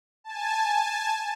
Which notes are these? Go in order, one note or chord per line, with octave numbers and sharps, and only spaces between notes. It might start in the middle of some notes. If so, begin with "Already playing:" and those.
G#5 A5